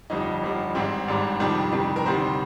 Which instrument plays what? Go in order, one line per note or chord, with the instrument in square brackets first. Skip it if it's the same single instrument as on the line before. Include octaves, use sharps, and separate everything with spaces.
[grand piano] G1 F2 D3 G3 D#4
G1 F2 D3 G3
G#1 G#2 G3 C4
G#1 G#2 G3 D4
F2 C3 D#3 G3 D4
F2 C3 D#3 G3
A#4
D2 C3 D#3 G3 C5